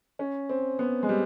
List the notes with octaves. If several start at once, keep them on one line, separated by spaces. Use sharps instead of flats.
C#4
C4
B3
G#3
G3